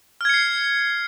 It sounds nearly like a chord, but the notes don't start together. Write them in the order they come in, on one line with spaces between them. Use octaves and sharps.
F6 G#6 C#7 C7